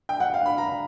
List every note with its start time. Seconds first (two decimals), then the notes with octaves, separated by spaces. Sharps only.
0.09 G5
0.20 F#5
0.34 F5
0.46 B5
0.58 A#5